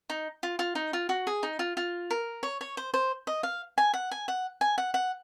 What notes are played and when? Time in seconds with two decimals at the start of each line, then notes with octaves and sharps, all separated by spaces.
0.10 D#4
0.43 F4
0.59 F4
0.75 D#4
0.93 F4
1.09 F#4
1.27 G#4
1.43 D#4
1.59 F4
1.77 F4
2.10 A#4
2.43 C#5
2.61 C#5
2.77 C5
2.94 C5
3.27 D#5
3.43 F5
3.78 G#5
3.94 F#5
4.11 G#5
4.28 F#5
4.61 G#5
4.78 F#5
4.94 F#5